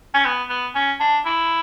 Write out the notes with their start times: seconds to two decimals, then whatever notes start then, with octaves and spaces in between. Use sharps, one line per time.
0.14 C#4
0.25 B3
0.50 B3
0.75 C#4
1.00 D4
1.25 E4